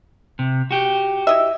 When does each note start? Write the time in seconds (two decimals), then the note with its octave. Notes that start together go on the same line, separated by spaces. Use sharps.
0.39 C3
0.71 F#4 G4
1.27 E4 D#5 E5